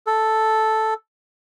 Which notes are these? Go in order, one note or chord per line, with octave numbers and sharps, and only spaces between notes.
A4